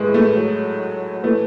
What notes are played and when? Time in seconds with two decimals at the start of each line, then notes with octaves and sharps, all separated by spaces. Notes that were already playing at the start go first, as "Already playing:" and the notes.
Already playing: A2 E3 G#3
0.14 A3
0.36 F#3
1.23 E3 A3